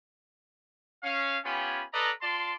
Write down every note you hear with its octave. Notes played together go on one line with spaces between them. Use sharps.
C#4 F5
B3 C#4 F4 G4 G#5 B5
A4 B4 D5 D#5 A#5
F4 D5 A5 C6